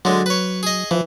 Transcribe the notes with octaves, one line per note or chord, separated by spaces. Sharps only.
D3 F#3 G#3
B4 C#5
G#4 D#5
E3 F3